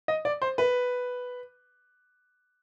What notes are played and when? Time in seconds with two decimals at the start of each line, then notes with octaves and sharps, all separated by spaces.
0.08 D#5
0.25 D5
0.42 C5
0.58 B4